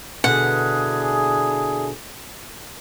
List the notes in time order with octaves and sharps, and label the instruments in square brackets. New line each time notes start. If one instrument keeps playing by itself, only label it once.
[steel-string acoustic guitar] B2 D3 [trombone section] D4 E4 G#4 [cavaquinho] F#5